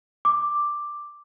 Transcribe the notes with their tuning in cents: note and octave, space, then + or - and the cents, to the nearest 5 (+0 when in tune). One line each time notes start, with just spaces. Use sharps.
D6 +5